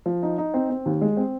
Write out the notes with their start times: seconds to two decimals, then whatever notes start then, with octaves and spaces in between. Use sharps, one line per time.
0.06 F3
0.23 D#4
0.38 D#4
0.54 C4
0.70 C4
0.86 D#2
1.01 G#3
1.17 C4